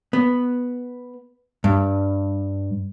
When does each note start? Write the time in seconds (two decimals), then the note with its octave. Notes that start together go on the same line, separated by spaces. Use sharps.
0.13 B3
1.64 G2